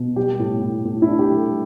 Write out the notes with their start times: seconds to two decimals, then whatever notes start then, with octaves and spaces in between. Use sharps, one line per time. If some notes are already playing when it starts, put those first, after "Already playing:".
Already playing: B2
0.16 G3 G4
0.39 A2
0.63 A2
0.85 A2
1.02 E4
1.07 D4
1.19 G4
1.31 G3
1.36 A4